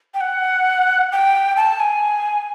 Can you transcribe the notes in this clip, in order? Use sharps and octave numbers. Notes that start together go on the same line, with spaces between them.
G5
F#5
G5
A5
G#5